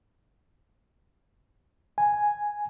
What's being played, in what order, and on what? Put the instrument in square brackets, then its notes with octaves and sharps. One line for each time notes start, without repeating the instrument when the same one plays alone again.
[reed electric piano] G#5